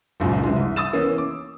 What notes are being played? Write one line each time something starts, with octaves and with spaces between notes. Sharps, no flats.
F#1 C#2 F#2 A#2
C3 E3 G#3 D4
C2
D#6 E6 A6 E7
E3 A#3 B3 C#4
D6